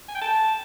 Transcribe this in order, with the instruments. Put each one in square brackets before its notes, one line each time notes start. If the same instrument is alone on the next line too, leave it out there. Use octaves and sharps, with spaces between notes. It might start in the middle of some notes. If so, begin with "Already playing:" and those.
[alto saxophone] G#5
G5
A5